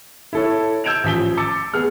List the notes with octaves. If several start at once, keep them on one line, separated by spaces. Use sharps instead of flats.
E4 A4 C#5
E6 G6 G#6 D7 E7 F7
A1 F3 B6 G7
D6 E6 A6 C#7
B3 G#4 F6